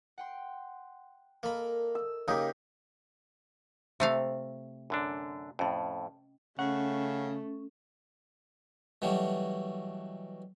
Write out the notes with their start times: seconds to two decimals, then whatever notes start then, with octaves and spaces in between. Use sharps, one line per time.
0.18 F#5 G5 C6
1.43 A#3 A4 A#4 D#5 B5
1.95 E6
2.28 C#3 A#3 D#4 G4 G#4
4.00 C3 A3 E5 F5
4.90 F#2 D3 D4
5.59 F2 A2 C#4 D#5
6.59 C#3 A3 C#4 F#5
9.02 B2 E3 F#3 G3 A3